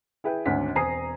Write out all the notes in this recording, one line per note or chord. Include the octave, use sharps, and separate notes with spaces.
E4 G#4 B4 G5
G#1 D2 C#4 D4 F#5 B6
E1 C4 G#5 A#5 D#6 C7